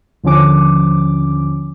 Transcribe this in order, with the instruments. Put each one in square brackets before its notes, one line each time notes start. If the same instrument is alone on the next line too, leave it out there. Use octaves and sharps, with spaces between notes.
[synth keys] D#2 D3 F3 C#4 D6